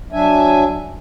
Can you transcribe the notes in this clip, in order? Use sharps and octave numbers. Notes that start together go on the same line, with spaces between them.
F#3 D4 E5 G#5